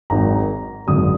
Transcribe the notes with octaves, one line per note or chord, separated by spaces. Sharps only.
G#1 G#2 D#3 F#3 A#5
G#1 F#2 D3 F#3 D#6